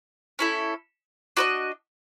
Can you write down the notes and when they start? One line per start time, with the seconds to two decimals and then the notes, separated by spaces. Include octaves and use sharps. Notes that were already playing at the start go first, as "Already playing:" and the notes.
0.39 C#4 E4 A4
1.37 D4 F#4 B4 D#5